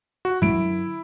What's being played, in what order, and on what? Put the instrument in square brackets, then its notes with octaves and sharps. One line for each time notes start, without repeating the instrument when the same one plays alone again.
[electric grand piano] F#4
[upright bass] F#2 D3 [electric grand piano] E4 D7